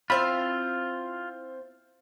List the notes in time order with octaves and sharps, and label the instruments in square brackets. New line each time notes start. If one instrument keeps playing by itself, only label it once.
[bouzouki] C4 E4 F5 [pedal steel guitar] F4 [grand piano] C5 A6 [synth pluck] B5